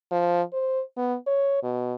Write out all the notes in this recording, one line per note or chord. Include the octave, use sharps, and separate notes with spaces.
F3
C5
B3
C#5
B2